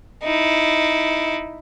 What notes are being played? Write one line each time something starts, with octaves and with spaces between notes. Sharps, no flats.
D#4 E4